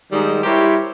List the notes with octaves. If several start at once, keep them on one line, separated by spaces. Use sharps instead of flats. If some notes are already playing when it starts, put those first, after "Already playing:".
G#2 D#3 G3 G#3 D#4
G3 E4 G4 A#4 C5 C#5